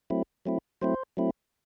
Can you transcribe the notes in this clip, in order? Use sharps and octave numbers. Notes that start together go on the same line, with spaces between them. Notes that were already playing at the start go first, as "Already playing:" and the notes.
F#3 A3 C4 E4
F#3 A3 C4 E4
F#3 A3 C4 E4 C5
F#3 A3 C4 E4